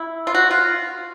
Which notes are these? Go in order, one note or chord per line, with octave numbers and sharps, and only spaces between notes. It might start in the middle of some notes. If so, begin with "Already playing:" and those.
Already playing: E4
F4
F#4
F4